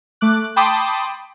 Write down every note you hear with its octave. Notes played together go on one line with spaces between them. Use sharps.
A3 D6 F#6
G5 A5 B5 C6 D6 D#6